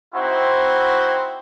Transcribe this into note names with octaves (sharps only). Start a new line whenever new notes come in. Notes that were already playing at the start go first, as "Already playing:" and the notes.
C4 D#4 E4 F#4 C5